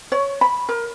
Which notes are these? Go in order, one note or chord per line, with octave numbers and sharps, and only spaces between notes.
C#5
B5
A#4